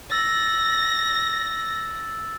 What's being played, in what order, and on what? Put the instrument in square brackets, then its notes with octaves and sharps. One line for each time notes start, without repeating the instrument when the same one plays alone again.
[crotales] E6 A6 [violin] A#6